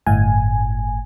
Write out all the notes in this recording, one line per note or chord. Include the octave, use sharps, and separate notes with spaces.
G1 A2 G#5